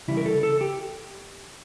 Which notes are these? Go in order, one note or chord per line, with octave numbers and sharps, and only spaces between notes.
C#3 E3 G3 E4
A#4
A4
A4
G4